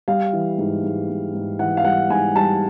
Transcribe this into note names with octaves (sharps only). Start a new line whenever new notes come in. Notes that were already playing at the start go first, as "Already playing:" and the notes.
G3 F5
E3
G#2
G#2
G#2
G#2
E3 F#5
F5
G3 F#5
G#2 G#5
G3 A5